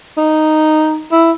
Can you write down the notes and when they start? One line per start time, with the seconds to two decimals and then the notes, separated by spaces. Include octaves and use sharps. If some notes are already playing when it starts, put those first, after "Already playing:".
0.18 D#4
1.12 E4